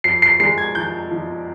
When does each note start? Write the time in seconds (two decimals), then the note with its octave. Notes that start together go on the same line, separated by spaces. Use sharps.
0.04 F2 C7
0.22 C7
0.40 G#3 C7
0.58 G#6
0.75 F3 G6
1.11 F3